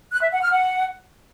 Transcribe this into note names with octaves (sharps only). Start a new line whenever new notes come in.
F#6
E5
F#5
F6
F#5